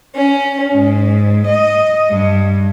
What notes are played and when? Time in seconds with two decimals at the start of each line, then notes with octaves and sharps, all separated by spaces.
0.13 C#4
0.74 G#2
1.48 D#5
2.10 G2